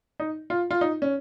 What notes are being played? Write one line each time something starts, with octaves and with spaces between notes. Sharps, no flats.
D#4
F4
F4
D#4
C#4